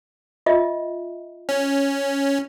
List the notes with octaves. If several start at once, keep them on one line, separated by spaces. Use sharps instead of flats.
F4 D#5 E5
C#4